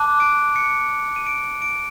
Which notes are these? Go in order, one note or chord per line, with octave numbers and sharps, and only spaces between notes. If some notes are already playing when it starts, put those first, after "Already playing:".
Already playing: A5 D6 F#6
D7
C#7
D#7
D7
D7